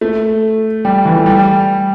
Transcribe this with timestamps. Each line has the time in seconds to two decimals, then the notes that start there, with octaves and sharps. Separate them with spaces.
0.01 A3
0.85 G3
1.05 E3
1.16 A3
1.26 G3